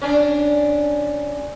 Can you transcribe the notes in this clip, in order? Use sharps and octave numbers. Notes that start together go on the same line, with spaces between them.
C#4 D4